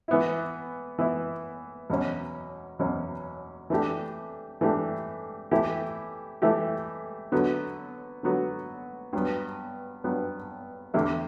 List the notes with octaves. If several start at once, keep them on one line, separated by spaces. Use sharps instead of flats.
E3 B3 E4
E3 B3 E4
E2 B2 F#3 C#4
E2 B2 F#3 C#4
E3 A3 D4 G4
E3 A3 D4 G4
E3 A3 E4 G4
E3 A3 E4 G4
D3 F#3 B3 F#4
D3 F#3 B3 F#4
G2 F#3 B3
G2 F#3 B3
E2 D3 A3 E4 G4